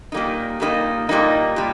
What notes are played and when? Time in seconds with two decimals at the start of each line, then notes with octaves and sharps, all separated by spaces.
0.12 A#2 G3 A#3 D#4
0.60 A#2 G3 A#3 D#4
1.09 A#2 G3 A#3 D#4
1.56 A#2 G3